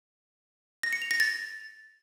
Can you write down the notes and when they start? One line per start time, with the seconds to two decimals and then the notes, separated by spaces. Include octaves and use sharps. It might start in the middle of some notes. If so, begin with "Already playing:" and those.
0.83 A#6
0.93 C#7
1.02 F7
1.11 A#6
1.20 A6